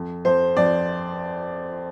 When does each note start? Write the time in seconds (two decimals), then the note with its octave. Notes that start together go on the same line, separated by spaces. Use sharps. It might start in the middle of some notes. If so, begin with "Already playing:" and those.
Already playing: F2
0.25 F2 C5
0.57 F2 D5